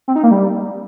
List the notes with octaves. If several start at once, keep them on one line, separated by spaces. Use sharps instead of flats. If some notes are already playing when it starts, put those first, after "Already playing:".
C4
D#4
A#3
G3